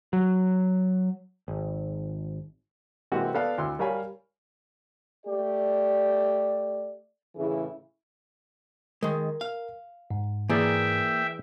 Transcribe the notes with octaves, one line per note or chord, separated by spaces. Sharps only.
F#3
G#1
C3 E3 G#3 A#3 F#4 G4
B3 A4 B4 D5 F5
D2 E4 C6 E6
G3 A#4 C#5 F5 G#5 B5
A3 G4 D5
A2 C#3 E3 E4 G#4
D#3 G#3 A#4
F5
G#2
E3 A#3 G#4 D5 E5 G5